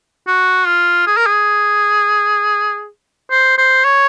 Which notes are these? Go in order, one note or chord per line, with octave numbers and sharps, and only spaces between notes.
F#4
F4
G#4
A#4
G#4
C5
C5
C#5